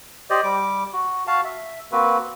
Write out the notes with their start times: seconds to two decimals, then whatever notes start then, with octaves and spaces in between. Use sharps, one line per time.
0.30 G4 C5 D5 D#5
0.43 G3 D6
0.93 F#4
1.27 F#4 F5 A5
1.45 E5
1.92 A#3 C4 F#4 B4